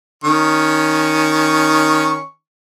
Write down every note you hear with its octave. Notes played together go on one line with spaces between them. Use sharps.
D#3 C#4 C#6